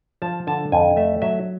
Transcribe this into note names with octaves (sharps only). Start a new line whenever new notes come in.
F3 A5
D3 A5
F2 G#5
A3 E5
F#3 E5